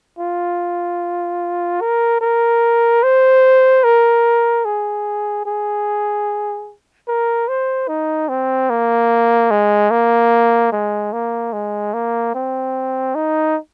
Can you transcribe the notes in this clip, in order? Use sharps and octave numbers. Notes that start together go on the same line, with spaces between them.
F4
A#4
A#4
C5
A#4
G#4
G#4
A#4
C5
D#4
C4
A#3
G#3
A#3
G#3
A#3
G#3
A#3
C4
D#4